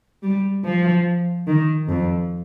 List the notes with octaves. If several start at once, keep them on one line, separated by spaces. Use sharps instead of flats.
G3
F3
D#3
F2